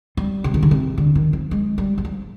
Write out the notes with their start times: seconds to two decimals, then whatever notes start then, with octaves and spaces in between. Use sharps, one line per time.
0.17 G3
0.44 C3
0.54 D#3
0.63 D3
0.71 C3
0.98 D3
1.15 D#3
1.33 F3
1.51 G#3
1.78 G3
1.98 G3
2.05 F3